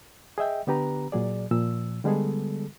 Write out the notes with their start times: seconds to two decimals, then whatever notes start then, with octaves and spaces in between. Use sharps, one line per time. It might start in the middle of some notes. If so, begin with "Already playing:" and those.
0.38 G#4 D#5 E5 G5
0.67 D3 B3 D4 G4 B4 A#5
1.12 A#2 F#3 G#4 D5
1.51 A#2 F3 E6
2.04 D3 G3 G#3 B3 G#4 A4